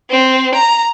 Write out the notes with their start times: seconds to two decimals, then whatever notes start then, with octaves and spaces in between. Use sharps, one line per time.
0.11 C4
0.55 A#5